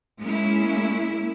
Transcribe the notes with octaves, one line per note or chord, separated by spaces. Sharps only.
G#3 A#3 C#4 E4